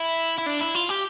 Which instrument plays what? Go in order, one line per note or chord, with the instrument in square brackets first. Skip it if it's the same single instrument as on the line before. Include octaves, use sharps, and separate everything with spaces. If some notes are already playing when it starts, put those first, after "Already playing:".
Already playing: [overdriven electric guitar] E4
E4
D4
E4
F4
G4